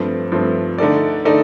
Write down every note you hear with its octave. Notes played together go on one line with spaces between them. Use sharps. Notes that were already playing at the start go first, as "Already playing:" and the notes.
Already playing: G2 F3 A3 C4
G2 F3 A3 C4
D3 A3 D#4 A4 D5
D3 A3 D#4 A4 D5